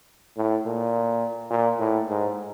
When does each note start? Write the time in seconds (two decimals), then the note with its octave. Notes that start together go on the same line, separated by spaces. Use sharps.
0.37 A2
0.65 A#2
1.50 A#2
1.79 A2
2.09 G#2